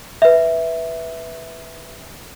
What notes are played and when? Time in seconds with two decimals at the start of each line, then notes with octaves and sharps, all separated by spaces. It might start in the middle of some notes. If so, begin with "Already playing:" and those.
0.22 B4 E5